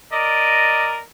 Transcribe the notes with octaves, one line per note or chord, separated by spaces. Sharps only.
A#4 D5 D#5